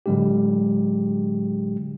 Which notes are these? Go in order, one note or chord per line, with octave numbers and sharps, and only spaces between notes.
A2 D3 F#3 G#3 D4 G4